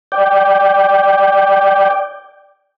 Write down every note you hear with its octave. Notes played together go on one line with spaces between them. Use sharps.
D5 G5